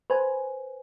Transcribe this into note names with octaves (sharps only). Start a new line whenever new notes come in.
B4 C5 G#5